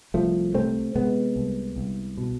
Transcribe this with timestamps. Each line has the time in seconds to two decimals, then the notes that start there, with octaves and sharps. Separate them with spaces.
0.14 C2 F3 A3
0.54 C3 A3 C4
0.95 C3 G#3 B3
1.36 C2
1.76 C2
2.18 B2